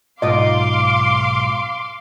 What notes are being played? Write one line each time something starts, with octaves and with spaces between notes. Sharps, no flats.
B1 G#2 F4 D#5 F5 C6 D6